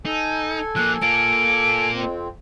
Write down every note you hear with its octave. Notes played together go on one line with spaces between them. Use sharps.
D#4 A4 G#5
F3 A#3 F#6
A#3 F4 D7
F2 C4